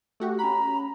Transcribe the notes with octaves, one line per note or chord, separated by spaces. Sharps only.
A3 F#4 G4
C#4 A#5 B5